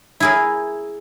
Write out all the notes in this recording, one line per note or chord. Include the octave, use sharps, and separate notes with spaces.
E4 G#4 A#4